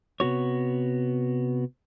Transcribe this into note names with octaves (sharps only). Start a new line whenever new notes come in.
C3 B3 F#4 C#5